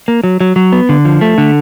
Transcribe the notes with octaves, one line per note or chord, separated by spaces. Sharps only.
A#3
F#3
F#3
F#3
B3
D3
F3
A3
D3